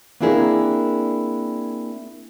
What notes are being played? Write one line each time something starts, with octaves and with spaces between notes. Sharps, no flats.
A#3 C4 D4 E4 G#4 A#4